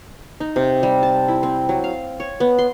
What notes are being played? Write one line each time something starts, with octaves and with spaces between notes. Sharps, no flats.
D#4
C3
G3
A5
E4
C4
F#3
F5
C#5
B3
C6